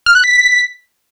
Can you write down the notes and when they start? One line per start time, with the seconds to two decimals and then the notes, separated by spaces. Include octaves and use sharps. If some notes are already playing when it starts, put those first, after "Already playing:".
0.06 F6
0.15 F#6
0.24 B6